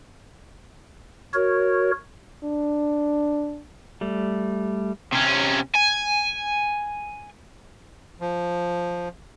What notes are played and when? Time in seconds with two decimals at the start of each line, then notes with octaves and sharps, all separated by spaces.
1.34 F#4 A#4 C#5
2.44 D4
4.01 G3 A3
5.12 C3 C#4
5.75 G#5
8.20 F3